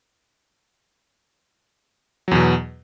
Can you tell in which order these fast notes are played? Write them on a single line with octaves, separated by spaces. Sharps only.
F#3 E2 B2